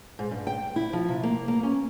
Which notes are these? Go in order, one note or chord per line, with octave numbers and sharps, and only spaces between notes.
G#2
G2
G5
E4
F3
C3
A#3
A#3
C#4